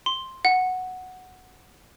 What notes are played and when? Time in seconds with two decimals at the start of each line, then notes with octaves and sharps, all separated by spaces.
0.06 C6
0.45 F#5